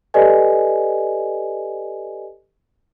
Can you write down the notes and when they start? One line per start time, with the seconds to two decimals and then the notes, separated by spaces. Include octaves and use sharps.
0.14 G4 A4 B4 D5 D#5 G#5